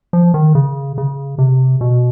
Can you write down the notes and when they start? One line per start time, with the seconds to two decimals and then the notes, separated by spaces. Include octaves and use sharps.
0.13 F3
0.34 D#3
0.55 C#3
0.98 C#3
1.38 C3
1.81 B2